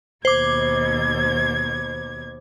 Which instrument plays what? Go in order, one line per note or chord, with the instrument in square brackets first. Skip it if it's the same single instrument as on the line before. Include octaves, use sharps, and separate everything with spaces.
[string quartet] D#2 B2 G#6 [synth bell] C5 D6